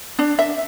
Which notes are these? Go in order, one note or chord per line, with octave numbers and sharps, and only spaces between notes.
D4
E5